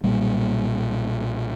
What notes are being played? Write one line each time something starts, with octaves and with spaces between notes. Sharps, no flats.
B1 A#2 G3 A#3